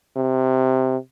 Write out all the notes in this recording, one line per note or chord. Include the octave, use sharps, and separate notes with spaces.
C3